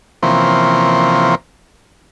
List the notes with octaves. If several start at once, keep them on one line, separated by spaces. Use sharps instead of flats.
C3 E3 F3 A#3 C4 C#4